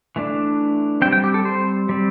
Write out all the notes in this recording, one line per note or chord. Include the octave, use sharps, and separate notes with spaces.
E3 A3 D4
G3 C4 G5
G5
G4
A4
C5
G3 C4